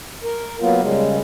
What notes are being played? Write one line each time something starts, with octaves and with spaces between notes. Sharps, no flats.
A#4
F#3 A#3 B3 F4
C#3 G3 G#3